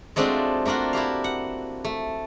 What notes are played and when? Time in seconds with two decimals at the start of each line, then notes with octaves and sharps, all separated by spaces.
0.16 G#3 A3 C4 D4 F4 F#4
0.65 A3 A#3 D4 F4 F#4
0.93 E4 F#4 G4 F5
1.24 F#5
1.84 A3